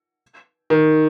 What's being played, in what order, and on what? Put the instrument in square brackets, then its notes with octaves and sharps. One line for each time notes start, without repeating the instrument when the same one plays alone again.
[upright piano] D#3